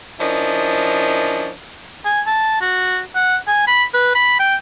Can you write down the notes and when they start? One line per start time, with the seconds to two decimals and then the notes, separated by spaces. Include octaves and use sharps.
0.20 F3 C#4 D4 E4 A#4 D#5
2.05 G#5
2.27 A5
2.61 F#4
3.15 F#5
3.48 G#5
3.67 B5
3.94 B4
4.15 B5
4.39 G5